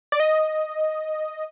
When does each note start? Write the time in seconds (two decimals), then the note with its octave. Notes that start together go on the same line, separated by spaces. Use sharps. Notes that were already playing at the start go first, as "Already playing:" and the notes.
0.12 D5
0.20 D#5